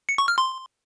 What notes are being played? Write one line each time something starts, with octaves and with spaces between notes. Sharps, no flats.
C#7
C#6
F6
C6